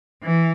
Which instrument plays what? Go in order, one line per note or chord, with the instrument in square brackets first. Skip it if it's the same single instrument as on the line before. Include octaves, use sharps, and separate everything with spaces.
[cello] E3